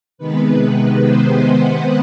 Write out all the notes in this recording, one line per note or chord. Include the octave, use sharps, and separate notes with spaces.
C3 D#3 G#3 B3 B4
C5
F#5